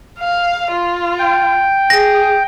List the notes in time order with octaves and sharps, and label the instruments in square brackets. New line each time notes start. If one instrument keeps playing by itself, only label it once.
[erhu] F5
F4
[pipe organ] G5
[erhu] G#4 [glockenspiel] A#6